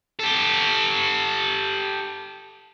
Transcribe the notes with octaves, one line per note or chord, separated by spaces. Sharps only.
G4 A4